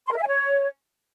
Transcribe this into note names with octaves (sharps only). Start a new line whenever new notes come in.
C6
A#4
E5
G#5
C#5